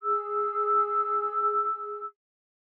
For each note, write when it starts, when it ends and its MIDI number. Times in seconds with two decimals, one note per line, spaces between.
0.02 2.05 68
0.02 2.05 88